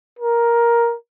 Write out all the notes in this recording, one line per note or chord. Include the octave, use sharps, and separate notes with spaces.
A#4